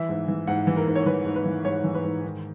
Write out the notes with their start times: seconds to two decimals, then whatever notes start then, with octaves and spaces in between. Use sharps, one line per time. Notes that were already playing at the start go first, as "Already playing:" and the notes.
Already playing: E3 E5
0.09 G#2
0.28 E3
0.47 G#2 F#5
0.67 E3
0.77 A#4
0.87 G#2
0.95 C#5
1.06 E3 B4
1.26 G#2
1.35 B4
1.45 E3
1.65 G#2 C#5
1.84 E3
1.94 B4
2.04 G#2
2.23 D#3